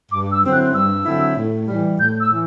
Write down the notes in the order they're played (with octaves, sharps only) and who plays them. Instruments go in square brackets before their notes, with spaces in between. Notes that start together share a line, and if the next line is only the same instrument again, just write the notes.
[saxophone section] G2 [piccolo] D6
[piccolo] E6
[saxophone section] D3 F#3 C4 E4
[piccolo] F#6
[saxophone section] G2 [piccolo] E6
[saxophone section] D3 F#3 C4 E4
A2
E3 G3
[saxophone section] A2 [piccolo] G6
[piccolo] E6
[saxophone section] E3